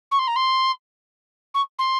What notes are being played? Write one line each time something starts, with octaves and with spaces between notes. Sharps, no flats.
C#6
C6
A#5
C6
C#6
C6